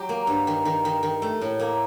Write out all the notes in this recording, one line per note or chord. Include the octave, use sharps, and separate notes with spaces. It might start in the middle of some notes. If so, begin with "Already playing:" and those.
Already playing: F#3 G4
A#3
G2
D#3
D#3
D#3
D#3
A3
A2
A#3